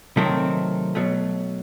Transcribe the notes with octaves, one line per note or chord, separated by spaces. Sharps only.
C3 D#3 F#3 A3 C4
B1 B2 F#3 A3